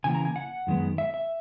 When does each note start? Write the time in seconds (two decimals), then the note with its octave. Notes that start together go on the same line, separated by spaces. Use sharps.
0.04 C#3 E3 A#3 G#5
0.15 A#5
0.25 G#5
0.36 F#5
0.67 F#2 D#3 G#3 B3
0.98 E5
1.14 E5